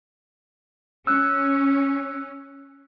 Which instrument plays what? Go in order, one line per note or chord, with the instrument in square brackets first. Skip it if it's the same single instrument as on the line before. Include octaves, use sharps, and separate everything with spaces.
[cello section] C#4 [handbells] E6 F#6